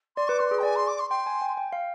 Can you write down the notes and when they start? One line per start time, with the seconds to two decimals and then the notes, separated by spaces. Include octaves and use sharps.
0.16 D5 C6
0.28 B4 D6
0.39 B4 C6
0.51 G#4
0.59 G5
0.63 D5 G#5
0.75 C6
0.87 D6
0.99 C6
1.10 G5 C6
1.26 G#5
1.41 G5
1.57 G5
1.73 F5